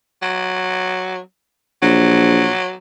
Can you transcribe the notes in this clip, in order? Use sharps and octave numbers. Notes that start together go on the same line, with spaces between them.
F#3
A#1 F#3